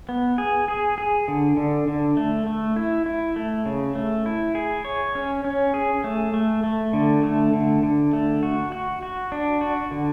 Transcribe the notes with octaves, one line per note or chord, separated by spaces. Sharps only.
B3
G#4
G#4
G#4
D3
D3
D3
A3
A3
E4
E4
A3
C#3
A3
E4
G#4
C#5
C#4
C#4
G#4
A3
A3
A3
D3
A3
D3
D3
A3
F#4
F#4
F#4
D4
F#4
D3